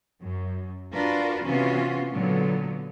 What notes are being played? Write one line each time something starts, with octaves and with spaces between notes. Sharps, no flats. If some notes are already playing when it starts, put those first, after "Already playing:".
F#2
D4 F4 F#4 A#4 B4
C3 E3 B3 C#4 F4 F#4
A#2 D3 F#3 B3